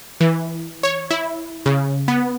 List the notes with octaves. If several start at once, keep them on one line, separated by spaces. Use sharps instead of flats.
E3
C#5
E4
C#3
B3